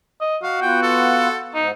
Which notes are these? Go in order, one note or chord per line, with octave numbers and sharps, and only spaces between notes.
D#5
F#4 F5
B3 F4 F#5 G5
A4
G#2 D#4